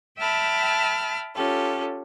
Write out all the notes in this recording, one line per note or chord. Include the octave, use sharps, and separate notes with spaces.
E5 G5 A5 B5 F6
C#4 F4 G4 A4